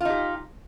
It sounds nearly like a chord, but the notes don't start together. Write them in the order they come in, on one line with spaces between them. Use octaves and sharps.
F4 D#4 G4